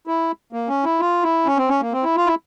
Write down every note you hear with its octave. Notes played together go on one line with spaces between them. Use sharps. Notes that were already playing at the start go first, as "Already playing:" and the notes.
E4
A#3
C#4
E4
F4
E4
C#4
C4
C#4
A#3
C4
E4
F4
E4